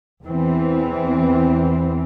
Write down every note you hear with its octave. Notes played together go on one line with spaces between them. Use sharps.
E2 E3 C4